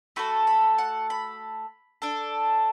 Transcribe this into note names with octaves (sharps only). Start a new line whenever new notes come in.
A3 F#4 A4 B5
B5
F#5
B5
D4 A4